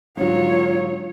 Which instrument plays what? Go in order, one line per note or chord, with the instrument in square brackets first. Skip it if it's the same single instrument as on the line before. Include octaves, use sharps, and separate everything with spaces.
[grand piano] G#2 D3 F#3 [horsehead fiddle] F4 C#5